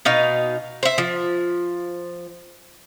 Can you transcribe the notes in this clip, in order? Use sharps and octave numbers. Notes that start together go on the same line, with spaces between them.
B2 D#4 F5
C5 E5
F3